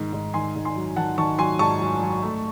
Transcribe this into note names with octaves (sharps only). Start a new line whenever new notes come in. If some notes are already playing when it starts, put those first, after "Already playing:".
Already playing: G#2 D#3
G#2
D#3 G#5 C6
G#2
G#5 C6
F#3
D#3 F#5 A5
D#3 A5 C#6
F#3 G#5 C6
G#2 A5 C#6
F#3
F#3
A3